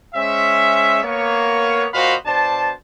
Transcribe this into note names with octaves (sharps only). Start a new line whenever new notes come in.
G#3 C#4 C5 E5
A#3 B3 C#5
A#2 F#4 C5 D#5 F5 B5
B2 D4 C5 A5